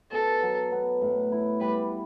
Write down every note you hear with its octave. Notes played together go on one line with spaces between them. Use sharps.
B2 A4
F#3
B3
A2
E4
G3 B4